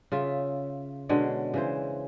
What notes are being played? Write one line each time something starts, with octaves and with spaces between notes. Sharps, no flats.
C#3 F4 E5
B2 D3 G#3 C#4
C#3 E3 C5